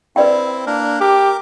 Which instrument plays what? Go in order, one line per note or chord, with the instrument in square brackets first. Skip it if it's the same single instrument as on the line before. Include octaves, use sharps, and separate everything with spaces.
[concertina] C4 E4 [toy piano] B4 D5 G5
[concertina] A#3 D4 A#4
[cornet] G4 [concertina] A#4 D6